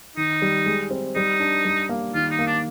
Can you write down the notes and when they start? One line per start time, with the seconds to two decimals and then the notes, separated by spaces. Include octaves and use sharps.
0.17 D#3 D#4
0.42 G3
0.66 G#3
0.91 C4
1.15 G3 D#4
1.40 D4
1.65 G3
1.89 A#3
2.14 D#3 F4
2.31 D#4
2.39 A#3
2.47 D4